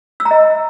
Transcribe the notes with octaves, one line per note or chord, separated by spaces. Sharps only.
E6
A#5
D#5